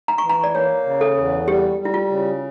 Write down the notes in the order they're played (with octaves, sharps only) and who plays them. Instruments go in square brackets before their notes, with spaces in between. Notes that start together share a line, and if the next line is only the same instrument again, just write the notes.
[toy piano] A#5
C#6
[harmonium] E3
[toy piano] A#5
D5
[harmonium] A#3 [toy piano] C#5
[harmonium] C#3
[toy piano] A4
[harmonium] E2
[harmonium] G3 [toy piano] G4
[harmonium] G3
[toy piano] E4
F4
[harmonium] C#3